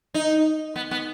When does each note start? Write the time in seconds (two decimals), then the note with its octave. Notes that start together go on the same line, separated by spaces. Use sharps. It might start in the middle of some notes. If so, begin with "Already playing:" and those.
0.14 D#4
0.76 B3
0.91 B3